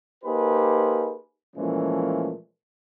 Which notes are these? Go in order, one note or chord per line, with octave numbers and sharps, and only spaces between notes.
A#3 D#4 G4 G#4 B4 C5
A#2 E3 F3 G#3 A3 C#4